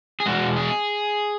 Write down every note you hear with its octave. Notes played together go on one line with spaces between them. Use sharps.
G#4
E2 B2 G#3 F#4
G#4